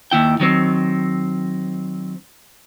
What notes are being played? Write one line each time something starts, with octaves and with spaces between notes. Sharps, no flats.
D#2 E4 G5
D#3 F#3 C4